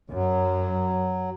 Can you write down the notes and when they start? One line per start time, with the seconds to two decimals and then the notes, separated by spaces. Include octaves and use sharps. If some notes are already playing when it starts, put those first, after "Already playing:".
0.10 F#2 F#3